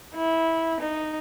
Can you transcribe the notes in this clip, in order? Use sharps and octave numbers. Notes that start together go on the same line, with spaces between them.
E4
D#4